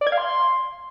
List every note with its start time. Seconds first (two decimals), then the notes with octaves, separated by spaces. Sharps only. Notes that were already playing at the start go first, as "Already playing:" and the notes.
0.01 D5
0.07 G#6
0.12 F5
0.18 C6